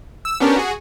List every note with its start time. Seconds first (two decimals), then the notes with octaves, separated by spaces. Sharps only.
0.25 E6
0.40 B3 C#4 D4 G4 A#4
0.56 F#4 G#4